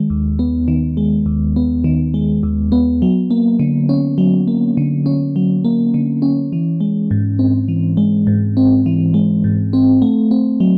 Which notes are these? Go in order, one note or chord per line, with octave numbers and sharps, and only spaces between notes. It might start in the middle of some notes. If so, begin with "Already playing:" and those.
Already playing: D#3 G#3
D#2
B3
D#3
G#3
D#2
B3
D#3
G#3
D#2
B3
F#3
A#3
D3
C#4
F#3
A#3
D3
C#4
F#3
A#3
D3
C#4
E3
G#3
G#2
C4
E3
G#3
G#2
C4
E3
G#3
G#2
C4
A3
C4
F#3